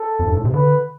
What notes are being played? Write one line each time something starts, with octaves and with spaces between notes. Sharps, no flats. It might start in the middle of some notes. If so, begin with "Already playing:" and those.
Already playing: A4
F2
G2
A2
C3
D3 B4